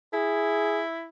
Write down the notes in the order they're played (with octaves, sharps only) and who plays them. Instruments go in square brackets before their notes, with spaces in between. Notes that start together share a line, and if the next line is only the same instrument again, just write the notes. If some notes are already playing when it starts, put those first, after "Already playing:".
[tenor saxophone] E4 [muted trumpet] G#4